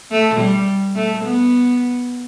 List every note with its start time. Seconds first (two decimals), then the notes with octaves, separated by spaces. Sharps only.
0.12 A3
0.40 G3
0.96 A3
1.24 B3